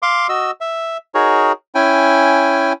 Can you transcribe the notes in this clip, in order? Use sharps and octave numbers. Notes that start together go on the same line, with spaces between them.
F5 C6 D6
F#4 D#5 E6
E5
D#4 F#4 G#4 A#4 C#5
C#4 E4 G5 G#5